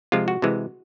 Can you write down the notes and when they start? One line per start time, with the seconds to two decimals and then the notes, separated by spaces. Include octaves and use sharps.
0.12 C3 F3 G#3 F4
0.28 F#4
0.42 C3 E3 G#3